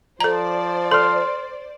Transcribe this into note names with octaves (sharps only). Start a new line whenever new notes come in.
F3 A4 C5 D5 A#5
A4 C6 F6